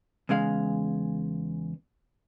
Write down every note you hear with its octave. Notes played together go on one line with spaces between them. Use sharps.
E2 C#3 G#3 F5